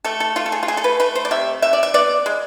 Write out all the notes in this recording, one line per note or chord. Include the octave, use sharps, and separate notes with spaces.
A3 A4
A4
A3 F4
A4
G#4
F4
A3 G#4
A4
B4
A3 B4
C5
D5
C3 E5
C3 E5
D5
E5
B3 D5
G#3